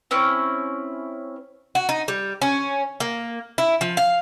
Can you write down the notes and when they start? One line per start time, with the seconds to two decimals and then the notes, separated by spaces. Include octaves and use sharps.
0.11 C4 C#4 E4 C#6
1.75 F#4
1.89 D#4
2.08 G3
2.42 C#4
3.00 A#3
3.58 E4
3.81 F3
3.97 F5